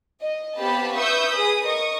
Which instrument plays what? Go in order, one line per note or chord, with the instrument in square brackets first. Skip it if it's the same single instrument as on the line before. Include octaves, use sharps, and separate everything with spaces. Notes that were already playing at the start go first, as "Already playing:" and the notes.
[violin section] D#5
B3 C4 G4 F5 A5 B5
B4 E5 C#6 D#6 E6 G6
G#4 B4 B5 D#6
A#4 D#5 C#6 D#6